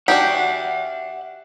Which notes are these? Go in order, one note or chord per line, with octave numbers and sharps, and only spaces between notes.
D4 F#4 G4 E5 F#5